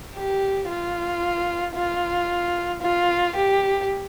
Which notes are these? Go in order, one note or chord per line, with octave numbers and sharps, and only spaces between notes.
G4
F4
F4
F4
G4